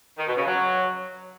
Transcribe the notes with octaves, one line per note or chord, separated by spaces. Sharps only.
D#3
B2
C#3
F#3